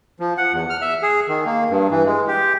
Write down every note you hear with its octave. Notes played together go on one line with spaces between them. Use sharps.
F3
F#5
E2
F6
E5
G#4
D#3
A#3
G2
E3
G#3
G4